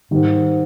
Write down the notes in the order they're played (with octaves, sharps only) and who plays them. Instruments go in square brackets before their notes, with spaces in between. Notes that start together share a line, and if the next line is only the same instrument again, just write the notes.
[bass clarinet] G#2 [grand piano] D#3 G3